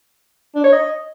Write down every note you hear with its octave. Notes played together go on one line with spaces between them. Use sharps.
D4
C#5
D#5